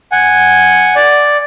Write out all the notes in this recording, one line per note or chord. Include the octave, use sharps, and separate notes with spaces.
F#5 G#5
D5